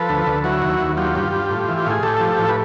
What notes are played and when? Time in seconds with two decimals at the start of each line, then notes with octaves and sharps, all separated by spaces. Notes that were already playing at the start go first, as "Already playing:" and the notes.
Already playing: F3 A4 B4
0.09 D2
0.27 D2
0.44 F#3 E4 F#4
0.62 D#2
0.80 D#2
0.97 F#3 F4 G4
1.15 G2
1.32 G2
1.50 A2
1.68 E3
1.78 G4
1.86 A2 G#4
2.03 A2 G4 A4
2.20 F3
2.39 A2
2.49 B4